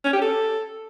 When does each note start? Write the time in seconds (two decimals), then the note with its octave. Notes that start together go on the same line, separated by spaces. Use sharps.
0.04 C#4
0.13 G4
0.22 A4